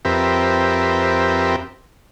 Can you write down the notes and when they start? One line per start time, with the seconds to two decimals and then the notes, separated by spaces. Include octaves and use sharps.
0.05 F2 C4 G4 A#4 B4 E5